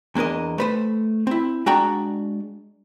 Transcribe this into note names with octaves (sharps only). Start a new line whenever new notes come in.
E2 A#3 D4 A#4 D#5
A3 B4 C5
C4 E4
G#3 D4 F#4 F#5 G5 A#5